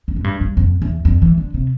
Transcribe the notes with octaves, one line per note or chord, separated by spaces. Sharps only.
F2
A2
G2
G2
F2
E2
F2
E3
D3
C3